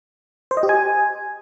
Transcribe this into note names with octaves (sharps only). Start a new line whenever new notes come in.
C5
D#5
G4
G#5